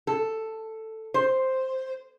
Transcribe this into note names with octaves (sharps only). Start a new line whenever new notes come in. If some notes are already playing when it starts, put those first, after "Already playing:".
A4
C5